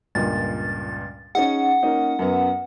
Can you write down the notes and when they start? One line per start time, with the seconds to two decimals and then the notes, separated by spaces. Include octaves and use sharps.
0.15 C#2 G2 A#2 A6
1.35 C#4 D#4 G#4 F#5
1.83 A#3 C#4 D#4
2.19 F#2 F#3 B3